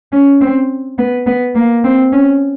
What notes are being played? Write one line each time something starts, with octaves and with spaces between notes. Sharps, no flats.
C#4
C4
B3
B3
A#3
C4
C#4